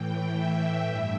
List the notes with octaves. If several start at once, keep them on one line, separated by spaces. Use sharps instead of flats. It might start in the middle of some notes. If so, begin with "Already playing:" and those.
Already playing: A2 E3 G5
E5
G2 E5